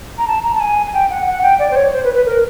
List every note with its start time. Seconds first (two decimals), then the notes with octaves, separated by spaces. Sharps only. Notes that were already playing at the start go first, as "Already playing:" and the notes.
0.18 A#5
0.28 A5
0.44 A#5
0.55 A5
0.60 G#5
0.86 G#5
0.94 G5
1.10 F#5
1.27 F#5
1.43 G5
1.59 D5
1.71 C5
1.75 C#5
1.93 C5
2.04 B4
2.14 B4
2.26 A#4